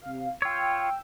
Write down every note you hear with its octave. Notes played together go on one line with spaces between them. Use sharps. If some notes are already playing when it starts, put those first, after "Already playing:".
C3 F5
F4 C#5 G5 E6